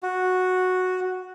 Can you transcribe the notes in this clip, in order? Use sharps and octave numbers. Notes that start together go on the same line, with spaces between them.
F#4